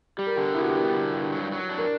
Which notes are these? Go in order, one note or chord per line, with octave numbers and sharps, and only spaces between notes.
G3 G4
A#4
D3 G4
B3 E4
F#4
G4
G3 A#4
D3
G2
F#3
F#3
D4
A#4